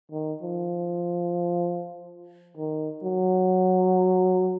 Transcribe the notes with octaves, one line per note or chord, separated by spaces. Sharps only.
D#3
F3
D#3
F#3